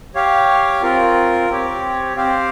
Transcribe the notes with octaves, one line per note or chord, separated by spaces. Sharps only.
G4 C#5 F5
C4 F4 A#4
C4 G4 C#5
C4 G4 C5 F5